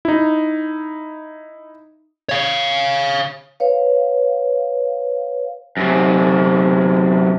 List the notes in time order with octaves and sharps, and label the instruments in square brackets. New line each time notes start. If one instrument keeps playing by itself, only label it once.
[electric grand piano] D#4 E4
[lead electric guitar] C#5 F5
[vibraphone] B4 C#5 F5
[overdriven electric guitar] F#2 C3